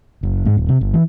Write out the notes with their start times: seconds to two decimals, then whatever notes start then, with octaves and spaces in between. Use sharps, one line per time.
0.23 F#1
0.45 G#2
0.57 D#1
0.69 C3
0.81 G1
0.94 E3